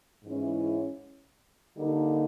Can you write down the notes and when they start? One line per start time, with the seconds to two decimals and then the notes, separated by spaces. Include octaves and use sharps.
0.23 G#2 E3 G#3 C#4 E4
1.77 D3 G3 A#3 D#4